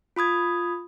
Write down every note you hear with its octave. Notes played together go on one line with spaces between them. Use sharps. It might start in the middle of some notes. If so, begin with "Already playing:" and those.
F4 B5 D#6 G#6